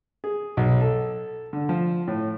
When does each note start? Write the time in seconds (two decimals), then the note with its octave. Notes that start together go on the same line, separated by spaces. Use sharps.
0.24 G#4
0.57 B1
0.81 A4
1.53 D3
1.69 F3
2.07 A2